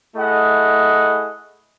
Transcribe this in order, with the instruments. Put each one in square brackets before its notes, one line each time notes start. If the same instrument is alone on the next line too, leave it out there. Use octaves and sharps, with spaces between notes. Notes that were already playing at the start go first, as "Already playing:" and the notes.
[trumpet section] A3 E4 G#4 D#5 F#5